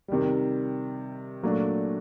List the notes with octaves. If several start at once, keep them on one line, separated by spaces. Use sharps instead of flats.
C3 D#3 G3
A#2 F#3 A3 D4